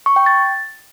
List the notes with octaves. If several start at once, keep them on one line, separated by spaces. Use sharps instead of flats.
C#6
G5
A6